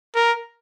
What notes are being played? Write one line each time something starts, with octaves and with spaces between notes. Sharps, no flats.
A#4